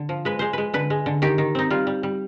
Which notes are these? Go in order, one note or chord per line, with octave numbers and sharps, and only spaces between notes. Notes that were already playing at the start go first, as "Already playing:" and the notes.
Already playing: D3
F3
G#3 B4
G#3 C5
G#3 B4
D3 B4
G#3
D3
D#3 G4
D#3
C4 D#4
G3 F4
G3
G3